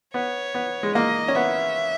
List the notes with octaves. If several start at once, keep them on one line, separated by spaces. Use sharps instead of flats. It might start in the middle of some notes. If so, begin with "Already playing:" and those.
B3 C#5
B3
G#3
A#3 D#5
C#4
B3 E5